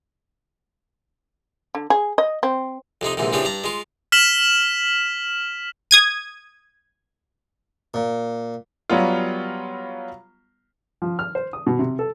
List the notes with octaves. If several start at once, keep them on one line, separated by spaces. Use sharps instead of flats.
D3
G#4
D#5
C4
F2 C3 C4 D#4
A#1 G#2 C3 E3
C#3 E3 F3 C4 D4 G4
G2 D4 A#5
G#3 F4
F6 B6 E7 F#7
D#6 G#6 D#7
A#2
F#3 G3 B3 F4
F3
F6
C5
D#6
B2
C3
A4